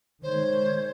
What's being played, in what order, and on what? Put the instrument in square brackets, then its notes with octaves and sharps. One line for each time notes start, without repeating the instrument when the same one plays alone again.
[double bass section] D#3 G#3 [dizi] C5 [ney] C#5